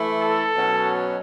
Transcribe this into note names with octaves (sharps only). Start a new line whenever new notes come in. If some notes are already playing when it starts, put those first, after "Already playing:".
Already playing: E3 A3 E4
A4
B2 F#3 C#4